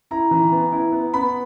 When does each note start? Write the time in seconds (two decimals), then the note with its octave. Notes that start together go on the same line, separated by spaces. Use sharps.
0.11 E4 A#5
0.31 E3
0.52 B3
0.72 E4
0.92 B3
1.14 B3 B5